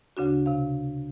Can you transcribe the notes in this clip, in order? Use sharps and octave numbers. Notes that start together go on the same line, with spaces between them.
D2 C#3 D4 F#4
C3 F5